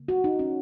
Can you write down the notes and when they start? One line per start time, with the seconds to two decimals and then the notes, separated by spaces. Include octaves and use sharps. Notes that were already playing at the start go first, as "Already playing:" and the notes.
Already playing: C#3 A#3
0.08 F#4
0.24 D#4
0.39 C#4